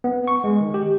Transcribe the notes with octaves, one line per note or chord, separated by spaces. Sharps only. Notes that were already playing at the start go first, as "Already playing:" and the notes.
B3
C#6
G#3
D#3
G4